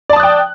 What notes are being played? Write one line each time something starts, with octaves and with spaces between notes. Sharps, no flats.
D5 G5 A5 D#6 F#6